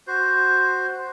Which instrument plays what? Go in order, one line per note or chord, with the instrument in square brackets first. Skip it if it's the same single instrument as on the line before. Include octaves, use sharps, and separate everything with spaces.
[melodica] F#4 C5